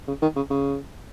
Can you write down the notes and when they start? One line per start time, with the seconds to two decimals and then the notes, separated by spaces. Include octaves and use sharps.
0.08 C#3
0.22 D#3
0.36 C#3
0.50 C#3